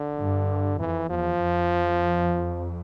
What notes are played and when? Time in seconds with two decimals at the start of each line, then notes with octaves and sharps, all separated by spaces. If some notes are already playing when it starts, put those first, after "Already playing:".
Already playing: D3
0.18 G2
0.79 F2 E3
1.10 E2 F3
1.40 F2